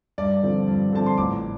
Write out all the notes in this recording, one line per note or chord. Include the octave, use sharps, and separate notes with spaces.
G2 D5
D3 F3 C4
G2
D3 F3 C4 A5
C6
A1 D6